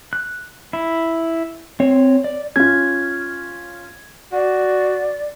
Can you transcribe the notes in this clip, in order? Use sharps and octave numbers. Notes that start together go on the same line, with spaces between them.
F#6
E4
C4 C#5
D5
C#4 F4 G#6
F#4 D5